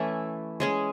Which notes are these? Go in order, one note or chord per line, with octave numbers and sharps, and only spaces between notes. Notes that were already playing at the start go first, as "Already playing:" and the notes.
Already playing: E3 A3 C#4 E4
G#3 C#4 G#4